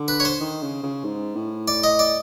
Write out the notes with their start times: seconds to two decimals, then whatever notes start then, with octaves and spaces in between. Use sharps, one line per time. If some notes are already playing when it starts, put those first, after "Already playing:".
Already playing: D3
0.08 B4
0.20 C#5
0.25 C5
0.41 D#3
0.62 C#3
0.83 C#3
1.04 G#2
1.36 A2
1.68 D5
1.83 D#5
1.99 D5